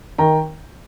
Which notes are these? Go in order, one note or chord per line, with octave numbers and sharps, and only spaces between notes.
D#3 G5 A#5